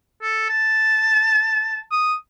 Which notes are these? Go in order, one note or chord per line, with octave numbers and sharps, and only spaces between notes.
A4
A5
D#6